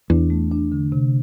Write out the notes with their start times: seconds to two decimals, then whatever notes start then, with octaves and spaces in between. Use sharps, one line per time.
0.10 E2 D4
0.30 A3
0.51 D4
0.72 D3
0.92 C3